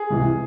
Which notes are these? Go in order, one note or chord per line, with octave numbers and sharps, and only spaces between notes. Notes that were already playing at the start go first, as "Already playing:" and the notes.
Already playing: G#4
C#2 C3 E3